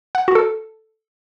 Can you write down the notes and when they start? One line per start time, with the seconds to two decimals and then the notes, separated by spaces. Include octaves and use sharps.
0.15 F#5
0.28 F#4
0.35 A4